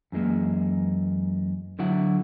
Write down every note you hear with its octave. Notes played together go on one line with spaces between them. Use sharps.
F#2 E3 G#3 A#3
D3 F#3 E4 F#5